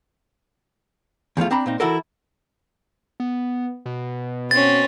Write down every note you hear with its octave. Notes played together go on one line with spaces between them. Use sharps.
E2 F3 A3 F4
C4 D4 A#5 B5
A#2 C4 D#4
E3 E4 F#4 A4 A#4
B3
B2
C4 C#4 A6